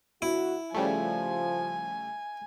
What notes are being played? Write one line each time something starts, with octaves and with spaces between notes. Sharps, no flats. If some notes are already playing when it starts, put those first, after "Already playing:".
D2 E4 F#4
C#3 F3 G3 A3 G#5